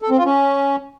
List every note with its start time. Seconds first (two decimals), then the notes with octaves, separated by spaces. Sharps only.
0.02 A4
0.10 C4
0.18 F4
0.25 C#4